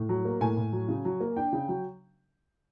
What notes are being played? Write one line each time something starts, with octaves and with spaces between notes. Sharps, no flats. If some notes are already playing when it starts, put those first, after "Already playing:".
Already playing: A2
F#3
A#3
A2 G#5
A2
F#3
C#3
F#3
A#3
D4 G5
C#3
F#3